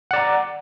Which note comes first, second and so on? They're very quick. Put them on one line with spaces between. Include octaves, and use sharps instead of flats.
F#5 D5 A#5